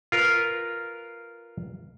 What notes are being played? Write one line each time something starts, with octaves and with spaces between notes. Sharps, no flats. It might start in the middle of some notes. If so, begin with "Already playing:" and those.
F4 A#4 B4